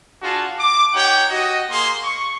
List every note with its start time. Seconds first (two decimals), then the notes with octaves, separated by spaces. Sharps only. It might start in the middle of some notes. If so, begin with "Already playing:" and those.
0.22 D4 F4 F#4 G#4 A5
0.58 D6
0.93 D#4 G4 C#5 F#5 G5
1.29 F#4 D#5
1.70 A#3 G#4 C6
2.02 C#6